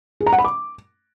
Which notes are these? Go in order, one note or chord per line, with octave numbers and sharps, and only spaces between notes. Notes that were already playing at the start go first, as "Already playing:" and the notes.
G#4
A#5
F#5
B5
D6